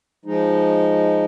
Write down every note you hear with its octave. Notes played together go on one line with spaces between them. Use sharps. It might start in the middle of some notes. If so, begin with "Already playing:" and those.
F3 G#3 D#4